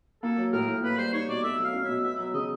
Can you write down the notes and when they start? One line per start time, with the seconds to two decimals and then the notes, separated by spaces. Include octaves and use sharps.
0.23 A#3 A4
0.38 F#3
0.53 A2 A#4
0.68 A2
0.83 A#3 B4
0.98 G3 C5
1.13 D#4 C#5
1.28 B2 D5
1.43 A3 E5
1.59 F#3
1.64 F5
1.73 C#4
1.84 E5
1.89 B2
2.04 B3 E5
2.19 F#3 E5
2.34 C#3 D#5